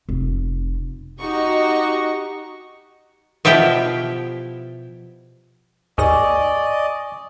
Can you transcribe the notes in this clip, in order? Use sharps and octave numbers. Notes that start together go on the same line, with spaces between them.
F1
D#4 F#4 G4 D#5 C#6
B2 F3 E4 G4 G5
D#2 G#2 D5 D#5 G#5 C#6 D6 A#6